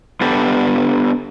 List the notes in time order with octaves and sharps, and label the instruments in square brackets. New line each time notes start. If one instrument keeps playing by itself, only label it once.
[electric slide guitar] B3 D4 G4 A4